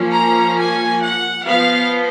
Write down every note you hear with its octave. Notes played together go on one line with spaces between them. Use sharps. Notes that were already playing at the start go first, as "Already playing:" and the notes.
Already playing: F3 A#3 C#4
A#5
G#5
F#5
F3 B3 F5